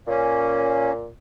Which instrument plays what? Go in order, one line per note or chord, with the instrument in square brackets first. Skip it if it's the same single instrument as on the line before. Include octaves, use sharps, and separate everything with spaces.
[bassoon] A#2 [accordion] A#3 C#4